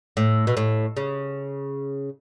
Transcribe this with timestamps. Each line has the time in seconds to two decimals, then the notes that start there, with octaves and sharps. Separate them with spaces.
0.17 A2
0.47 B2
0.57 A2
0.97 C#3